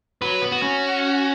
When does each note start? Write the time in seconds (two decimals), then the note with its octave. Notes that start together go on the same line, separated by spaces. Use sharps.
0.22 F#3 B4
0.42 B3
0.52 F#4
0.62 C#4